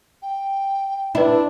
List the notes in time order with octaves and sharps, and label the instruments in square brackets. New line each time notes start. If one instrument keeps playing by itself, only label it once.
[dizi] G5
[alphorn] D4 [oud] E4 [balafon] B4 E5